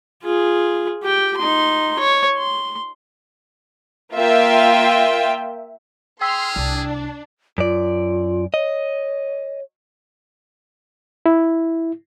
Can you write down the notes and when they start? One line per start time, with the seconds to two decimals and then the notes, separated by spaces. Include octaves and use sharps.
0.23 F4 G#4
1.03 G4 G5
1.37 D#4 C6
1.99 C#5
2.37 C6
4.16 A#3 F4 E5 G5
6.21 G#4 G5 C6 E6 F6 B6
6.56 C2 D4
7.58 F#2 F4 D5
8.54 C#5 D#5
11.26 E4